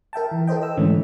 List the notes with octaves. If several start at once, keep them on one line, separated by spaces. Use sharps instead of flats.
A#4 E5 G5 A5
E3
A4 B4 C5 D#5 G5
D#5 E6
G#2 D3 E3 A3 C#4